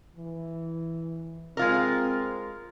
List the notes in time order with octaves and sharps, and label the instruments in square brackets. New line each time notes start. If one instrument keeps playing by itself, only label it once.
[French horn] E3
[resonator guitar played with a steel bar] G#3 F4 A#4 [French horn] C4